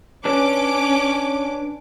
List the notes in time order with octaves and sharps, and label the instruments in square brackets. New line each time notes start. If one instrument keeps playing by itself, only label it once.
[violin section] C#4 D6 [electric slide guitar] D4 B4 C#5